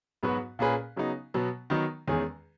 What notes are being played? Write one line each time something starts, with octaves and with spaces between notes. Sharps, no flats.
G#2 F#3 B3 F#4 B4
A#2 A#3 C#4 G#4 B4
C#3 F#3 B3 D#4
B2 F#3 B3
D#3 F#3 B3 D#4
E2 D#3 G#3 C#4 G#4